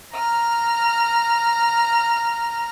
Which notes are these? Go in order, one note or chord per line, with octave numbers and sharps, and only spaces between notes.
A#5 F6